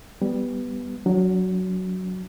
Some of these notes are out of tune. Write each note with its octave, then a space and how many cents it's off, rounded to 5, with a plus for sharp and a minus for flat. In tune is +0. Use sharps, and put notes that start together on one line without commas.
G3 +0 B3 +0
F#3 +0 D4 -45